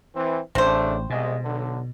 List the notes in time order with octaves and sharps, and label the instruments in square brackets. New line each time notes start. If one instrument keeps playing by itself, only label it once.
[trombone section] E3 C4
[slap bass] A1 [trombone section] C#3 A3 D4 [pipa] C4 C5
[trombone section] C2 G#3 [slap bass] B2
[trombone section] B1 D3